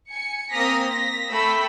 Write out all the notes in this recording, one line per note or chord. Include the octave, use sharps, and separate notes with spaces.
G#5 C#7
A#3 C4 D#6 F6 A#6 B6
A#6 B6
A3 G5 B5 E6 B6